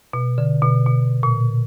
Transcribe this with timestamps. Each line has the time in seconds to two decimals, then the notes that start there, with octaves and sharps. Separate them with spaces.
0.13 B2
0.38 D3
0.62 B2
0.87 B2
1.23 A#2